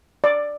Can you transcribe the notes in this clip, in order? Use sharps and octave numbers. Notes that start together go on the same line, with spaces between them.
D5